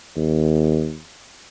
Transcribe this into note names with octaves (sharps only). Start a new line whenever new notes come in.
D#2